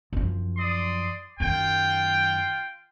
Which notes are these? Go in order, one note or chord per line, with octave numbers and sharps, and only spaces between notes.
F#2 F3
D5 C6 D#6
F#2 D#3 F4 G5